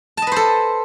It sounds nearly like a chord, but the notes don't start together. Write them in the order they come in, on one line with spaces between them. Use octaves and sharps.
A5 D#5 B4 C5 A4